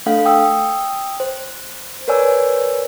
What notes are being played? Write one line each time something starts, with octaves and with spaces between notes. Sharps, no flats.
A3 D4 A4 F5 F#5
G5 D#6 E6
C5
A#4 B4 C#5 D5 G#5 E6